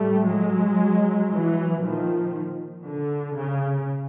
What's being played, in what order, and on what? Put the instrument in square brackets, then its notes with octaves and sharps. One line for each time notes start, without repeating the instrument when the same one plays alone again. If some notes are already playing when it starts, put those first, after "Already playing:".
Already playing: [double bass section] A2 G3 A3
F#3 G#3
E3 F#3
A#2 D#3 F3
D3
C#3